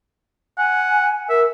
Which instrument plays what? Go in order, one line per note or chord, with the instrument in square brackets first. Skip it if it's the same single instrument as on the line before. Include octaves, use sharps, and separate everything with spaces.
[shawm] F#5 [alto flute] G#5
[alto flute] A#4 [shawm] E5